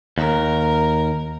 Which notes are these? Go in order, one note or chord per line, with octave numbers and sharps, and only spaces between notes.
D#2 A#4